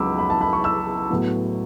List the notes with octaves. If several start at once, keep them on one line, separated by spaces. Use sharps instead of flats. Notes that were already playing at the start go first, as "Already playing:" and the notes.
Already playing: C#2 C#3 F#3 B3 B5 D6 E6
B5
A5
B5
C#6
E6
A2 F#3 B3